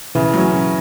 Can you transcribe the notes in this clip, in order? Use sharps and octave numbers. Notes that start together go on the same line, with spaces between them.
C#3 E3
F#3 C#4
C#3